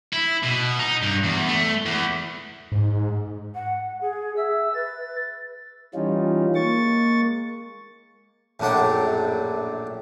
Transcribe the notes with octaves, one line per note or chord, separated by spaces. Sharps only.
E4
B2
D#4
G2
E2
A3
E2
G#2
F#5
G#4
E5 E6
B4 A6
E3 G3 C#4 D#4 F4
G#3 A#3 C#6 A6
A#1 F#2 A2 D4 F#5 G5